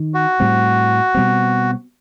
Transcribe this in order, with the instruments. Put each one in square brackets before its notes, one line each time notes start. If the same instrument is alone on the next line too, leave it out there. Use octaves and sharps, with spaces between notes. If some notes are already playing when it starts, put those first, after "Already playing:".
Already playing: [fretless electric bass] D#3
[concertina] F#4
[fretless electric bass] A2 G3 C4
B2 G3 C4